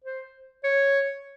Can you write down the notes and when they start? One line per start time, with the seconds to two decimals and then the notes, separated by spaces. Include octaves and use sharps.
0.04 C5
0.64 C#5